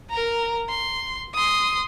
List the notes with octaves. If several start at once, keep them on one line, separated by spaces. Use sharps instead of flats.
A#4 A#5
C6
C6 D#6